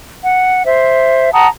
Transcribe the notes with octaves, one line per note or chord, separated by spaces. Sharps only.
F#5
C5 E5
F#5 A5 A#5 D#6